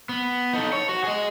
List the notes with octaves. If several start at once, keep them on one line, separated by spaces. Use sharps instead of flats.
B3
D#4 A4
C#5
F#4
G#4 D#5